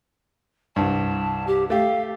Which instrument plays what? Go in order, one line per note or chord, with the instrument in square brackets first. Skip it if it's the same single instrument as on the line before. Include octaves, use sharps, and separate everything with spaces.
[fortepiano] C2 G2 [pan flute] A5
[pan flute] G4
[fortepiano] A3 G4 [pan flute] F5